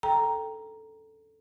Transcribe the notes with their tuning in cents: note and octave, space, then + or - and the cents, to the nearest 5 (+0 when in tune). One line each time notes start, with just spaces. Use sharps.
A4 +0 G5 +0 A#5 +5